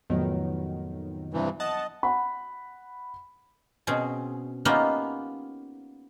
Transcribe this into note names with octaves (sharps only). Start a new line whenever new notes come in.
F2 A2 D#3 F#3 B3
G2 C3 E3
D#5 F#5 A5
F#5 B5
B2 C4 C#4 G#4
A#3 B3 C#4 D#4 F4 G4